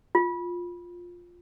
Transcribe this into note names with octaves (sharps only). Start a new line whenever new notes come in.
F4